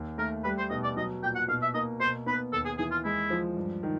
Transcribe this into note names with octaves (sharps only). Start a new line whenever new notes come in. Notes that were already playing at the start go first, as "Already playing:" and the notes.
Already playing: D#2
A3 A#4
G3 B4
C5
B2 D#5
D5
F#3 D#5
A#2 G5
F#5
B2 F5
E5
A#3 D#5
B2 C5
B3 B4
D#2 A4
G#4
E3 G#4
F4
G#3 E4
F3
G2
D#3